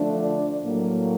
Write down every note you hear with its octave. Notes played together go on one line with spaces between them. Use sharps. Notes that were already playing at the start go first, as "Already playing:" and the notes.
Already playing: D3 F3 A3 D4
D5
A2 F#3 A#3